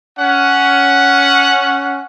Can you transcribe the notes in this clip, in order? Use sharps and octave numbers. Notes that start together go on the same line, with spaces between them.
C#4 F#5